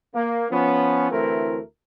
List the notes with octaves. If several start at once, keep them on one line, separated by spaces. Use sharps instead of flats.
A#3
F3 B3 C#4
D2 E3 A3 C4 E4 A#4